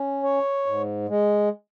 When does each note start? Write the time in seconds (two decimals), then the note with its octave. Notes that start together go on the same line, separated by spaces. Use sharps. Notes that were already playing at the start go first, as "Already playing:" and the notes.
Already playing: C#4
0.23 C#5
0.66 G#2
1.09 G#3